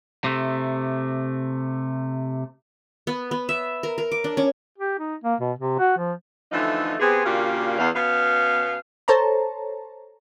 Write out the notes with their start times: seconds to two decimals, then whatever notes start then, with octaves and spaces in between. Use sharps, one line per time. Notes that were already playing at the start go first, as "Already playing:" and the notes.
0.24 C3 A3
3.07 B3
3.31 B3
3.49 E5
3.83 A#4
3.98 A#4
4.12 D6
4.24 D4
4.37 C#4
4.78 G4
4.99 D#4
5.24 A#3
5.41 B2
5.59 C3
5.79 F#4
5.98 F3
6.52 D3 E3 F3 A3 D#4
7.00 C3 B3 C4 G#4
7.25 A#2 C#3 A#3 D4 F#4 G4
7.78 E2 F5
7.95 B2 B3 C#4 F5
9.08 A4 C5 C#5 A5 A#5